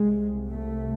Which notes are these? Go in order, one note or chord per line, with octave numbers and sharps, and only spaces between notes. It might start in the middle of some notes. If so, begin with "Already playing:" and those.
Already playing: C2 C3 G#3
A3